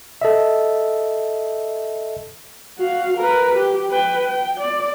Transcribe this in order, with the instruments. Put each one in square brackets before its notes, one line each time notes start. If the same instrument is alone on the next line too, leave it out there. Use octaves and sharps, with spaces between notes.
[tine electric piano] A4 D#5 E5
[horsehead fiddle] F#4 F5
A#4 B4
G4
B4 G5
G5
D5